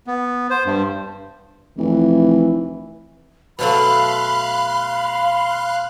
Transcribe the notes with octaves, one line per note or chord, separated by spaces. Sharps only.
B3
C5
G2
F1 E3
B2 F#3 A3 F5 B5 C6 F#6